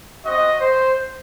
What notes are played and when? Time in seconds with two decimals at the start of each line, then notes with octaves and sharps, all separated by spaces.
0.24 C4 F#4 D#5
0.60 C5